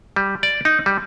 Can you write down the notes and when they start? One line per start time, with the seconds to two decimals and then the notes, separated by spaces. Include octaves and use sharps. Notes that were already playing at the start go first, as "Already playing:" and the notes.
0.16 G3
0.43 D5
0.65 D#4
0.86 G3